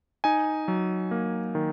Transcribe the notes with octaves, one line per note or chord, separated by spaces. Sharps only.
D#4 G#5
F#3
A#3
D#3